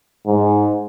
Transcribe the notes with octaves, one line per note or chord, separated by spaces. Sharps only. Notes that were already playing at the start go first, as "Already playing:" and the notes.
G#2